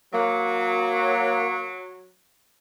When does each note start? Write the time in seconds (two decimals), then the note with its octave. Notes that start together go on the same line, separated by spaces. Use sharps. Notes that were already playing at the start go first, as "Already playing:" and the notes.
0.14 F#3 A#3